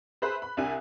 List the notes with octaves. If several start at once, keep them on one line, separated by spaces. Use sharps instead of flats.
G#4 B4 C5 E5 B5 F#6
B5
C2 D4 G4 E5 G#5